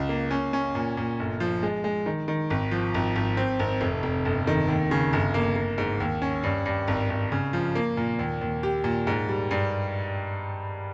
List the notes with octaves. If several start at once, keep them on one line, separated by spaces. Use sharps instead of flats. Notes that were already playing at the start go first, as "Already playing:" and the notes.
Already playing: C#2
A#3
C#4
C#4
A#2
A#2
G1
F3
G#3
G#3
D#3
D#3
G#1
F3
G#1
G#1
C4
G#1
F1
F1
G1
D#3
D#2
C#3
G1
A#3
A#3
G#2
D#2
C#4
G2
G2
G#1
G#1
C#3
F3
A#3
A#2
D#2
D#2
G4
A#2
G#2
G3
G2